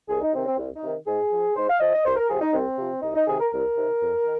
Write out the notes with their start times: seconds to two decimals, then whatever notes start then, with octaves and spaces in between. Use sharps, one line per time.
0.08 C2 G#4
0.22 D#4
0.33 C3 D#3 C4
0.45 C4
0.58 C2
0.75 D#4
0.82 C3 D#3
1.06 G#2 G#4
1.31 F3
1.56 G#2 C5
1.68 F5
1.80 F3 D#5
1.93 D#5
2.05 C2 C5
2.16 A#4
2.29 C3 F3 G#4
2.41 D#4
2.53 C2 C4
2.78 C3 F3
3.02 C2 D#4
3.15 D#4
3.27 C3 D#3 G#4
3.39 A#4
3.51 C2 A#4
3.75 C3 D#3
4.01 F2
4.24 D#3